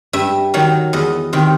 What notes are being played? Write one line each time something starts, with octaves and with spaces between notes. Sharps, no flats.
G2 E5
D#3 F#3
E2 D#5
C3 D#3